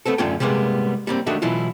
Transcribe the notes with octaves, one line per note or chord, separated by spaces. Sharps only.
A3 B3 C4 A4
F#2 D3 A3 C#4 F4 G5
C3 G3 G#3 A#3 B3
G3 A#3 C4
D#3 A3 D4 F#4 A#4 E5
B2 E3 F#3 E4 F4